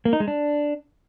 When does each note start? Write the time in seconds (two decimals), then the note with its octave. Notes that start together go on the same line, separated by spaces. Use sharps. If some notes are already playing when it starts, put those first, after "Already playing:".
0.05 A#3
0.13 D#4
0.20 G#3
0.28 D4